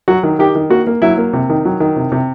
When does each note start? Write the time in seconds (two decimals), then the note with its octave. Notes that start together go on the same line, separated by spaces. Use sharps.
0.08 F#3 F#4
0.23 D#3
0.39 D#3 G4
0.55 D#3
0.70 A#3 F#4
0.87 A#3
1.02 F#3 E4
1.18 A#3
1.33 C3
1.50 D#3
1.65 F#3
1.80 D#3
1.96 C3
2.12 C3